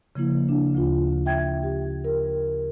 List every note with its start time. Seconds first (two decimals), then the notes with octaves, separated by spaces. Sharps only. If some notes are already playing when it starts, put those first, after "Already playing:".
0.15 C#3 F3 A#3 E4
0.49 D4
0.75 D2 F4
1.26 E5 G5 G#6
1.63 G4
2.04 A#4